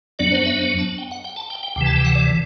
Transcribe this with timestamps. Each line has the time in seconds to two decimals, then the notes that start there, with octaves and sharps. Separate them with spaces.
0.19 F#2 F#3 B3 D4 D5
0.32 C5
0.45 E5
0.59 C5
0.79 A5
0.98 G5
1.11 F#5
1.24 G5
1.36 A5
1.50 G5
1.63 G5
1.76 D2 C3 E3 G5
1.86 A5
1.96 G5
2.05 F#5
2.15 D5